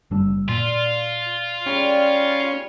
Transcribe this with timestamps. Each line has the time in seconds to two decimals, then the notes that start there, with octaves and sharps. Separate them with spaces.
0.11 F#1 G3 D4 E6
0.49 A#2 F4 D5
1.66 G3 G#3 C#4 G4
1.81 A#4